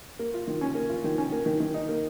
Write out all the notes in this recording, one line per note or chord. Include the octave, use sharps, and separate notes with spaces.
A#3
F4
D#3
C#4
A#3
F4
D#3
C#4
A#3
D#3
D#3
D#4
A#3